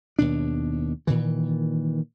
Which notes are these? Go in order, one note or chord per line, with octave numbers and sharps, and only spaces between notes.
D#2 B2 D4
A#2 D#3 E3